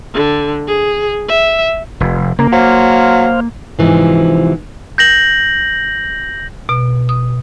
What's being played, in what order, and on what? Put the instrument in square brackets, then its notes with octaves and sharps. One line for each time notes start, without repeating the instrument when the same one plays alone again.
[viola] D3
G#4
E5
[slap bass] F1
[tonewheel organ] C#3 A#4 [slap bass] A#3
[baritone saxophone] F#3 [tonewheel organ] C5 F5
[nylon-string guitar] G#2 C3 E3 F3
[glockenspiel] G6 A#6 F#7
[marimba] B2
D#6